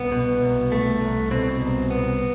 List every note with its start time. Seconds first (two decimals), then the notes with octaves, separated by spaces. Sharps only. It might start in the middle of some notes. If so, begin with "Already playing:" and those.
Already playing: C2 B3
0.12 B2
0.41 C2
0.72 A3
1.01 C2
1.31 B2 C4
1.61 C2
1.91 B3